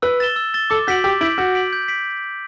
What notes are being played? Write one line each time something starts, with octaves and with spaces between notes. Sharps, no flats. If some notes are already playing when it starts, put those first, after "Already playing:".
B4 E6
A6 E7 G7
E6
A6 E7 G7
A4 D6
F#4 G6 B6 D7 F#7
G4 D6
E4 G6 B6 D7 F#7
F#4 G6
B6 D7 F#7
G6
B6 D7 F#7